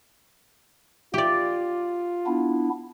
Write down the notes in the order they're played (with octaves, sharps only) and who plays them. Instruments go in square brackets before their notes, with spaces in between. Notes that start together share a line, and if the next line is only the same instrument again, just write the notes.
[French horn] F4 [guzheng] G4 D5
[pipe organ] B3 D4 E4